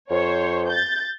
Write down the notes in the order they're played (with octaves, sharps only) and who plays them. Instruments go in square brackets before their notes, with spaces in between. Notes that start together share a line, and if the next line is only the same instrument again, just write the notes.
[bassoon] F2 [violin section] C5 C#5
[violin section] G6 A6